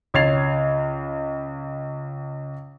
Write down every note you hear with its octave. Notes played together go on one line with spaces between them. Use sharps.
C#2 C#5 G#6 A6 C7 F7